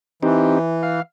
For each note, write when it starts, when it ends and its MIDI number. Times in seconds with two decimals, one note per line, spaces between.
0.23 1.00 52
0.23 0.59 60
0.23 0.59 63
0.23 0.59 67
0.83 1.02 77